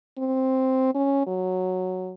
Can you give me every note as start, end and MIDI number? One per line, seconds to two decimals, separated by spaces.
0.18 0.92 60
0.94 1.25 61
1.27 2.13 54